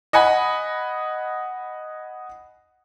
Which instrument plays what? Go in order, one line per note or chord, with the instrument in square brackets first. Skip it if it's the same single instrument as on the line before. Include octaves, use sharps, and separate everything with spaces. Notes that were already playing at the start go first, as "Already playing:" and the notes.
[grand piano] D#5 F#5 G#5 B5